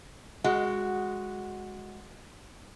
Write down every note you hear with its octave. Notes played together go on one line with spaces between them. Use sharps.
G#3 F#4